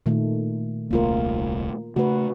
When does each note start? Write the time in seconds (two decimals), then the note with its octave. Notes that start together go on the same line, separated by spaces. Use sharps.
0.06 A#2 D#3 A3
0.91 D#1 C2 A3 A#3 F4 A#4
1.96 C#3 A3 F#4 B4